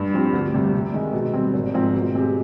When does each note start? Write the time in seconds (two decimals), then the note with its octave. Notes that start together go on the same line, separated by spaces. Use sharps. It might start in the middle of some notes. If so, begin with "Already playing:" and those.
Already playing: G2
0.13 F3 C4 G4
0.33 D2
0.54 C3 G3
0.74 C3
0.94 D#3 G#3
1.13 B2
1.33 G3 C4
1.54 G#1
1.74 G#2 F3 C4
1.93 B2
2.13 G#3 C4 G4